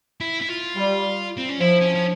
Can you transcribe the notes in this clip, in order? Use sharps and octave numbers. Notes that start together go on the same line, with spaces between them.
E4
E4
F4
G3
C4
C#4
F3 E4
C#4
C#4